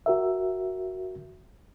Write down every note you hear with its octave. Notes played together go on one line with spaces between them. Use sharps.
F#4 A#4 E5